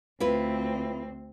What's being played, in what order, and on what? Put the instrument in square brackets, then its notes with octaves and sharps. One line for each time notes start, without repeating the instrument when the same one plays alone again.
[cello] D2 C4 [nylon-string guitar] E4 F4 B4